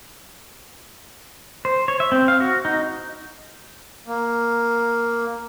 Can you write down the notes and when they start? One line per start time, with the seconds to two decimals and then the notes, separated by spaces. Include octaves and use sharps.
1.65 C5
1.88 C#5
2.00 E5
2.12 C4
2.28 F5
2.40 F#4
2.65 D#4
4.07 A#3